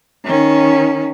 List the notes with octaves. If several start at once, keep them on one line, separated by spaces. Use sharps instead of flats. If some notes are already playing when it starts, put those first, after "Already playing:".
D#3 C#4